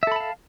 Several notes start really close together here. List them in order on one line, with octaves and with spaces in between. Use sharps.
E5 A4 B5 A5 F5